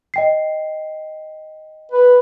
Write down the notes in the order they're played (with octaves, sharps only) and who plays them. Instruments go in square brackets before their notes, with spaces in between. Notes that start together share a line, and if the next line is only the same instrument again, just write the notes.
[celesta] D#5 G5 C7
[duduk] B4